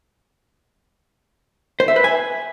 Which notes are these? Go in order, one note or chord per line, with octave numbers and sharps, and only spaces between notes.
C5
E5
B4
G#5